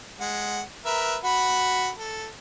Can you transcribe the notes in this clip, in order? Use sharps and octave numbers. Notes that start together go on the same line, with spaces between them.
G#3 F#5
A#4 B4 E5
F#4 F#5 B5
A4